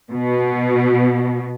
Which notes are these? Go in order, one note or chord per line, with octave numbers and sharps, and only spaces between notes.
B2